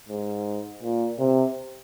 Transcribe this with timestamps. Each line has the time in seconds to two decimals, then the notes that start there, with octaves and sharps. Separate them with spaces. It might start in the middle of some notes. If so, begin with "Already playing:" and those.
0.09 G#2
0.83 A#2
1.19 C3